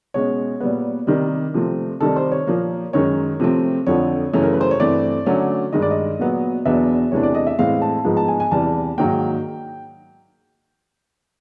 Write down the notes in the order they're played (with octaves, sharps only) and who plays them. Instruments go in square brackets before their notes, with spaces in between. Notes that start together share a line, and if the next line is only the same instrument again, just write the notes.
[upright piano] B2 G#3 C#4 C#5
A#2 G3 B3
C3 D#3 G3
C3 F3 A3 C4
C3 D#3 G3 A4
C5
C#5
A#2 F3 A#3
F#2 D#3 G#3 C#4 C#5
C3 F3 A3 C4
F2 D3 F3 C#5
F#2 C#3 E3 A3 C#4
A#4
B4
C5
C#5
G2 E3 A3 C4 D5
D3 F#3 A3 C#4
G2 D#3 G#3 D#5
D5
D#5
A#2 F#3 B3
E2 B2 F#3 B3 D4 E5
E2 C3 E3 A3 D4 C#5
D5
D#5
E5
A2 E3 G#3 C4 F5
A5
G#2 F3 G#3 B3
A5
G#5
G#5
E2 C3 E3 G3 A5
G#2 D#3 F#3 A#3 G5